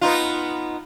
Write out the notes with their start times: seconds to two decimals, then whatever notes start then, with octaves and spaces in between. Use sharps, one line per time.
0.01 B3 D#4 F4